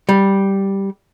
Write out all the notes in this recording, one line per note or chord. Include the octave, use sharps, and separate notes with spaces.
G3